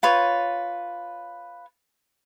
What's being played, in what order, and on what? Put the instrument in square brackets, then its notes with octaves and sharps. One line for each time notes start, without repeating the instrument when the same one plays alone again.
[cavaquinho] F4 B4 C#5